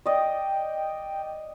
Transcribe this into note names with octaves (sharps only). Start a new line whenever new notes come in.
D5 D#5 G5